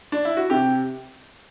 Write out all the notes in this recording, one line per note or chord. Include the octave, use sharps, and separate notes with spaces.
D4
E4
F#4
C3 G4